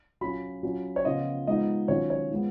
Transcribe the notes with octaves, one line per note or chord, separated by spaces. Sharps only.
F#3 C#4 F4 B5
F#3 C#4 F4
C#5
C#3 F3 B3 F4 D#5
F3 G#3 B3 D#4 D#5
D#3 F#3 C#4 F4 C#5
C#5
F3 G#3 B3